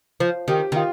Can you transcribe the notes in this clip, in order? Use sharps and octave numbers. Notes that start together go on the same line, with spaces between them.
F3
D#3 G4
D#3 F4